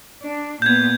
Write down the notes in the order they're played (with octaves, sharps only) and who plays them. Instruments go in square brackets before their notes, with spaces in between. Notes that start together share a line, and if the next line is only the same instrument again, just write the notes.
[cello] D4
[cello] A#2 B3 [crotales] G6 G#6